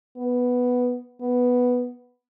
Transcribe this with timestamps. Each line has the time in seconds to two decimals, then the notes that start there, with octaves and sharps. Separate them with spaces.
0.17 B3
1.21 B3